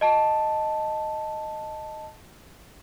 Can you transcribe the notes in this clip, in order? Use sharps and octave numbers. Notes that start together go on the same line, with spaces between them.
D#5 A5